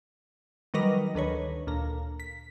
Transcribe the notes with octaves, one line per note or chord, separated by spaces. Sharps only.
D#3 F#3 G3 A#4 B4 D#5
D2 D#3 B4 C#5
D2 A#2 A#5
B6